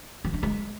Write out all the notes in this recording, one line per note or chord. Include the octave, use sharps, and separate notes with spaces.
E3
D4
G#3